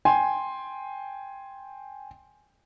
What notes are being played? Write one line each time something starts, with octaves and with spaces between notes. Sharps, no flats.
G5 G#5 C6